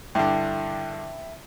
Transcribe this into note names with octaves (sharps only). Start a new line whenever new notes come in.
G2 D3 E4 G5 A5